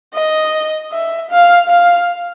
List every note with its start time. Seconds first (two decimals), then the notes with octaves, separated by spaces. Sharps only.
0.15 D#5
0.92 E5
1.31 F5
1.69 F5